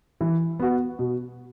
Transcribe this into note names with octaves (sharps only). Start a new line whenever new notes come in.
E3
B3 F#4
B2